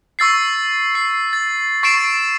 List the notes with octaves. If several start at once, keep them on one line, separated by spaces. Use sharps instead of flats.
C#6 E6 A6 C7
C7
A6
C#6 A6 C7 D7 E7